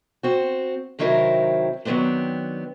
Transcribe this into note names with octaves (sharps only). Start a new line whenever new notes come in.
C4 F#4
C3 D#3 F#3 C4 E4 A#4
D#3 F#3 G3 B3 C4 D4